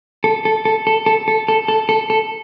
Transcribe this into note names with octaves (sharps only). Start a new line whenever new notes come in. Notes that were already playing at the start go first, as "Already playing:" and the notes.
A4
A4
A4
A4
A4
A4
A4
A4
A4
A4